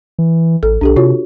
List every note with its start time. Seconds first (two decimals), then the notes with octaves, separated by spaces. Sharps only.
0.19 E3
0.63 A1 A4
0.81 B1 D4 G4 A4
0.96 C3 F4 F#4 C#5